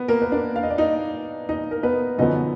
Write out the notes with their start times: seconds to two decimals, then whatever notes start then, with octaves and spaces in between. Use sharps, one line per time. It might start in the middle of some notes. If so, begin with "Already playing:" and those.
Already playing: B3 B4
0.08 A#3 A#4
0.22 B4
0.32 D4 D5
0.56 F5
0.63 D#5
0.70 D5
0.78 D#4 D#5
1.49 D#4 D#5
1.71 A#4
1.83 B3 B4
2.18 F#2 D3 F3 B3 D#4 D#5